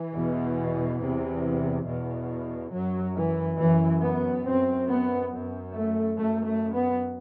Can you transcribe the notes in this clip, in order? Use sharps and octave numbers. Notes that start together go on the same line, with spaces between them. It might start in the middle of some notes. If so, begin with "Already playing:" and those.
Already playing: E3
E2 B2
E2 C3
E2 B2
F#2 F#3
E3
F#2 E3
B3
F#2 C4
B3
F#2
A3
F#2 A3
A3
B3